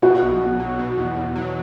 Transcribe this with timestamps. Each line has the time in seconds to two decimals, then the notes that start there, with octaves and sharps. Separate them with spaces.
0.02 B2 F#4
0.22 B1
0.41 B1
0.59 F#3
0.79 B2
0.97 E2
1.17 E2
1.36 F#3